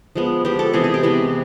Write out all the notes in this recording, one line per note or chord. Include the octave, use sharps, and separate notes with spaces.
F3 G#3 B3
F3 G#3 B3 G4
A4
C3 E3 G#3 B3 G#4
G#4
G4
C3 E3 G#3 B3